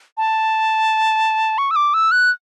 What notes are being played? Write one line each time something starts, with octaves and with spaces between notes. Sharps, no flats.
A5
C#6
E6
D6
E6
F#6